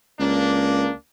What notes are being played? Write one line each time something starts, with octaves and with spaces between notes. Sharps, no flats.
C#2 A#3 D4